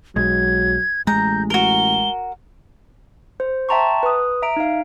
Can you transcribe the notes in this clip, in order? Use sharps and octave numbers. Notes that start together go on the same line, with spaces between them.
B1 F#3 G#3 G#6
A1 G#3 A#5 G6
F#4 A#4 G7
C5
E5 G5 A5 A#5 C6 C#6
B4 D#6
E5 A#5 D7
D#4 F5